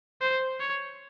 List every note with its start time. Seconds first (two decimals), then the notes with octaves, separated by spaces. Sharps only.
0.21 C5
0.60 C#5